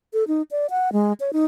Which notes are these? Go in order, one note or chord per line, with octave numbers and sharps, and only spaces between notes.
A4
D#4
D5
F#5
G#3
C#5
D#4